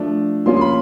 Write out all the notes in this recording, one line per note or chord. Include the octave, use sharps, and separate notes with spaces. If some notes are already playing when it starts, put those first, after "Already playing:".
Already playing: F3 A3 D4
F3 A#3 C#4 F4 C6
C6
B5